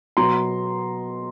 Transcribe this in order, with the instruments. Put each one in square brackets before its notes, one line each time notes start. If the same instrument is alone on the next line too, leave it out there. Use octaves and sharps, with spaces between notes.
[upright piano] B2 F#3 B3 A#5 C6